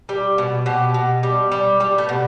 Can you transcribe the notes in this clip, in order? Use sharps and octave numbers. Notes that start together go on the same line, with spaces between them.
G3
B2
B2 G4
B2
G3
G3
G3 G4
A3
B2